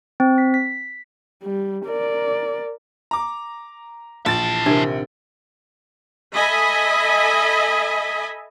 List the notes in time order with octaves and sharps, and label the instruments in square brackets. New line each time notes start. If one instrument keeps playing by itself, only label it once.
[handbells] C4
B6
B6
[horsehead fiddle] G3
A#4 D5
[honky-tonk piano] A#5 D6
[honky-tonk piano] A#1 A6 [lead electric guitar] E3 A5
[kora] C3 D#3 [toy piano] D4
[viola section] A4 D#5 E5 G#5 B5